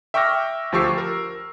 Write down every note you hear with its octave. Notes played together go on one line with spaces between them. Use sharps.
E5 G5 C#6 D6 F6 A#6
D2 F3 G4 C#6 E6 C7
A#4